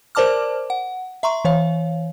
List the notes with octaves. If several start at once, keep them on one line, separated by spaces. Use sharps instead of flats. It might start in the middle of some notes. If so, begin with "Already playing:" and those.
A#4 C5 D5 A5 D6 F6
F#5
E5 A#5 C6 C#6
E3 C#5 F5